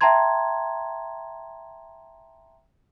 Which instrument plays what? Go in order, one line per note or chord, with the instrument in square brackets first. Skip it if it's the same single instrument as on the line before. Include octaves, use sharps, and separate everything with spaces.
[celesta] E5 G5 A5 A#5 C6 G#6